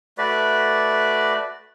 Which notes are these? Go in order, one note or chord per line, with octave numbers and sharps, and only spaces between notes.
A3 F#4 B4 D5